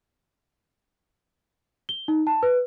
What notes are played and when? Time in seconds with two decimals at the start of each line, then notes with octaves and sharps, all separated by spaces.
1.89 G7
2.08 D#4
2.27 A5
2.43 B4